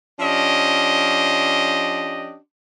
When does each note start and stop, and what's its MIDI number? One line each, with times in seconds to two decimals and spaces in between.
0.20 2.37 53
0.20 2.37 61
0.20 2.37 62
0.20 2.37 67
0.20 2.37 75